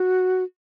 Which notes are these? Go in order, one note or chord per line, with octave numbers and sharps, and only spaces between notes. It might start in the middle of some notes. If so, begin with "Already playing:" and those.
Already playing: F#4